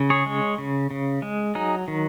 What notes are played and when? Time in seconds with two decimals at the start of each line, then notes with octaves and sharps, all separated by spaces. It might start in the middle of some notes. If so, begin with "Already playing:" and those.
Already playing: C#3
0.10 G#4 C#5
0.26 G#3
0.58 C#3
0.91 C#3
1.22 G#3
1.55 F#3 D#4 G#4
1.88 D#3